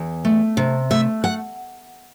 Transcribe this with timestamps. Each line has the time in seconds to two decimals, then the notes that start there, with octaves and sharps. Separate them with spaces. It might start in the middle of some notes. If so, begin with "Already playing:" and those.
Already playing: E2
0.25 A3
0.57 C3
0.91 A3 E5
1.24 F#5